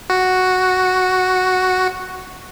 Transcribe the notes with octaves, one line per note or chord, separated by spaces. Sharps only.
F#4